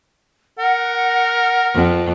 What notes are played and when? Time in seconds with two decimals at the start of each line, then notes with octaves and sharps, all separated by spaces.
0.59 A#4 F#5
1.75 F2